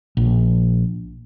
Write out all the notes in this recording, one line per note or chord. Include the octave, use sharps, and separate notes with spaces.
A#1